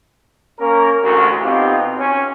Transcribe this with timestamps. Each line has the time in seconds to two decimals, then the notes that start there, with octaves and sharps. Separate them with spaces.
0.59 A#3 C#4 A#4
1.03 A1 D2 A3 F#4
1.43 B2 C4 D#4 F4 G4
1.98 C#4